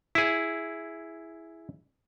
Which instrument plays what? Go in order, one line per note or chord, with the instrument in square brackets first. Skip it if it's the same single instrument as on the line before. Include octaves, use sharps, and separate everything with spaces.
[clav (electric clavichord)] E4 G#4